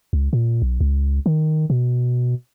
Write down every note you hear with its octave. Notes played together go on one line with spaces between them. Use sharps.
C#2
A#2
B1
C#2
D#3
B2